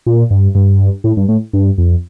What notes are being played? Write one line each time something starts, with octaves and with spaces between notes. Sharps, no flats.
A#2
G2
G2
A2
G2
A2
G2
F2